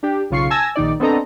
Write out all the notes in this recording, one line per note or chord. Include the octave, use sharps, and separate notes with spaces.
D4 G4
B1 C#3 F4 C#6 C7
G#5 A5 E6 G#6 A#6
A#1 D#3 D#4 D5
B3 C4 D4 A4 D#5 A#5